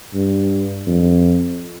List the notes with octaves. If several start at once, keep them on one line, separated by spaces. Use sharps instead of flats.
G2
F2